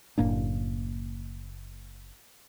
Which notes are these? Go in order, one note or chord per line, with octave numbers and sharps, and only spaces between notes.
F#1 A2 A#3 D4